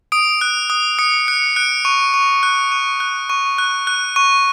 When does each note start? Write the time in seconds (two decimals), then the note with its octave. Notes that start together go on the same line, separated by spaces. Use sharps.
0.12 D#6 D7
0.41 F#6
0.70 D#6
0.99 D#6 C#7
1.28 F#6 C#7
1.56 F#6 D7
1.85 C#6
2.14 C#6
2.43 F#6
2.72 C#6
3.00 F#6
3.30 C#6
3.58 F#6
3.87 F#6
4.16 C#6